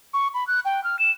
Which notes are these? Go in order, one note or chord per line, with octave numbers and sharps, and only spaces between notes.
C#6
B5
F#6
G5
F6
E7